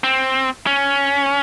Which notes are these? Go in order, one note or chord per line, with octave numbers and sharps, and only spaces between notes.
C4
C#4